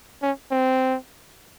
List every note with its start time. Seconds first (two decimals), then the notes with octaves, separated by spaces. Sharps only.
0.22 C#4
0.51 C4